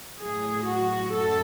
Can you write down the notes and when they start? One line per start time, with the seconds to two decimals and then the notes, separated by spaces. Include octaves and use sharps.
0.20 A2 F#3 G#4
0.66 F#4
1.12 F#2 A4